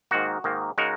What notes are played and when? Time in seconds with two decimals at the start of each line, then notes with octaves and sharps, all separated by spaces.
0.11 G#2 D#3 A#3 F#4
0.44 G#2 D#3 A#3
0.78 C#3 G#3 D#4 F#4 A#4